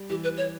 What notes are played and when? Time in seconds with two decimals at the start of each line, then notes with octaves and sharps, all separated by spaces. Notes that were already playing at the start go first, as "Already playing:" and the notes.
Already playing: G3
0.10 E3 G4
0.24 B4
0.37 C#5